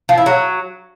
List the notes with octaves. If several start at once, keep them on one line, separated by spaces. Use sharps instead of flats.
F3
E4
F#3